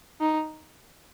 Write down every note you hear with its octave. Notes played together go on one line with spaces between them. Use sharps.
D#4